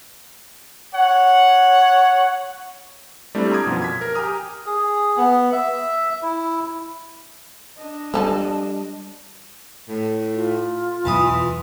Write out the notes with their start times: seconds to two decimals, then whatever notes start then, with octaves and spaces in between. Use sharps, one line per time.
0.95 C#5 F#5
3.35 G3 A3 C4 D4 E4
3.52 A#5 C6 D6 D#6 G#6
3.65 F#2 B2 F3
3.82 G#6 B6
4.01 A#4
4.14 G4 G#5 A#5 D#6 F6
4.66 G#4
5.17 B3
5.52 E5
6.23 E4
7.78 D4 D#5
8.14 F3 G3 G4 A4
9.88 A2
10.34 F4
11.05 E2 B2 E3 F#3 A5 C6 D#6